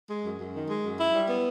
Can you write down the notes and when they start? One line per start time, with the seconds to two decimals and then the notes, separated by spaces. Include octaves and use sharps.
0.09 G#3
0.24 F#2
0.39 F#2
0.54 D#3
0.69 G#3
0.84 F#2
0.99 E4
1.14 G3
1.29 B3